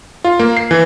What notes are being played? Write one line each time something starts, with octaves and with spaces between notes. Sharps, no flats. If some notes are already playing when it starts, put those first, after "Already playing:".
F4
A#3
C7
E3